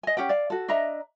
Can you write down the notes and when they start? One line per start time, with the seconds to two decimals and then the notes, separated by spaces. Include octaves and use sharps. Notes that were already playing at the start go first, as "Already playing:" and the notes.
0.03 D#5 G#5
0.17 C#4 G4 F#5 G5
0.29 D5 F5
0.50 F#4 A4
0.68 D4 D#5 E5 A#5